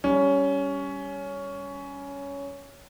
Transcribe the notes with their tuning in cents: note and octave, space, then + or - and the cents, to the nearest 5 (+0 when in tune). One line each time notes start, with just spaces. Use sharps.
G3 +0 C#4 +15